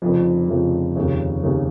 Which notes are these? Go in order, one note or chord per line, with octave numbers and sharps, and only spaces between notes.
F1 F2 C#3
F1 F2 C#3
F1 D#2 C#3
F1 D#2 C#3